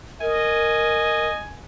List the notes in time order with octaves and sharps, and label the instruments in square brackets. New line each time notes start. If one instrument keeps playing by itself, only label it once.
[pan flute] A#4 [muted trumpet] D#5 [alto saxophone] G#5